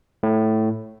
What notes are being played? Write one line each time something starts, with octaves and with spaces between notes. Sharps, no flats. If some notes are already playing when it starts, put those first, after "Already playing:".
A2